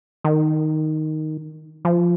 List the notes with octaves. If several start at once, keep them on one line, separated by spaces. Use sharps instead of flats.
D#3
F3